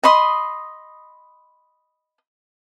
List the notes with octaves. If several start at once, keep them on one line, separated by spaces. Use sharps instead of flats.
D#5 B5 C6 D#6